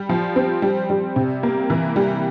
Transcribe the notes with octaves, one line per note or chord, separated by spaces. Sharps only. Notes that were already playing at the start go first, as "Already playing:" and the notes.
Already playing: G3
F3
C4
G3
G3
C3
A#3
E3
G3